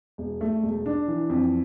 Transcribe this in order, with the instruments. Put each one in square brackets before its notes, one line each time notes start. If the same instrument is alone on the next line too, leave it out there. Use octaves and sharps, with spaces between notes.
[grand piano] E1
A3
E1
D4
E3
F2